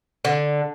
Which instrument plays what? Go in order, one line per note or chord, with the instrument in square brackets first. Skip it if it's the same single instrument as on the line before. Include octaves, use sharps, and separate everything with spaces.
[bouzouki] D3